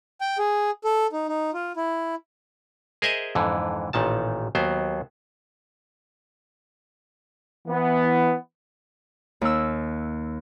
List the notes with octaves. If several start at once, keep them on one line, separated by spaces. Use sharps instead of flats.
G5
G#4
A4
D#4
D#4
F4
E4
G#4 A#4 C5 D#5 E5 G#5
F2 G#2 D3 E3
A1 A#2 D#3 A5
D#2 F#3 B3 C5
E3 B3
D#2 E6